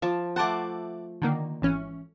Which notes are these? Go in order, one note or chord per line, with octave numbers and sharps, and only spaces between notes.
F3 A5 D6
A3 C5 F#5 A5 D6
D3 D#3 A#3
G#1 E3 C#4